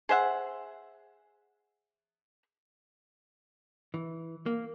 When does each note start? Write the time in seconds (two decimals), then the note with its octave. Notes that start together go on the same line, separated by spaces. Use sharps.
0.09 G#4 C5 E5 F#5
3.94 E3
4.46 A#3